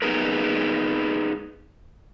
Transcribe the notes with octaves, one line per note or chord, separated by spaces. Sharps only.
B3 D#4 G#4 A#4 B4